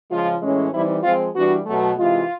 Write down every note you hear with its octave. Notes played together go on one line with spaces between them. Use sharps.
C#3 F3 G#3 C#4 F4
A2 E3 G#3 C#4
E3 G3 C4 D#4 E4
F3 G#3 C4 F4
E3 G3 B3 D4 F#4
B2 F#3 A3
C3 E3 G#3 F4